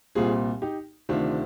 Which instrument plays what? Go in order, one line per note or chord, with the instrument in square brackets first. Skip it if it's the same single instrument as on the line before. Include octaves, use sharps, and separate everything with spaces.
[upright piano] C2 A#2 G3 C4 F4 G#4
D#4 G4
D2 C3 D#3 D4 F4